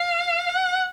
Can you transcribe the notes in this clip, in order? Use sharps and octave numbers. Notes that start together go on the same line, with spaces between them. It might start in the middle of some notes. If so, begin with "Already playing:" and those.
Already playing: F5
F#5